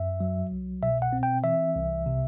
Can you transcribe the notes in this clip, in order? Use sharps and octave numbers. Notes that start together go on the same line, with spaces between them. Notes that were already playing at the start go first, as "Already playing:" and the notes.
Already playing: F#2 E5
F#3
C2
B2 E5
F#5
C4
G5
E3 E5
C2
C3